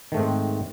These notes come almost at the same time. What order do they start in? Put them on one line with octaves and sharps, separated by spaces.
D#3 A3 G#2 C4